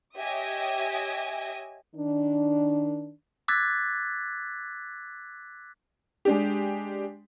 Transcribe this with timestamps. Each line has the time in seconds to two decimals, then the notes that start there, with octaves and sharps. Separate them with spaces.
0.17 G4 C#5 D#5 E5 G#5 D#6
1.96 D#3 D4
3.48 D6 E6 F#6 G#6 A6 B6
6.25 G#3 D4 G4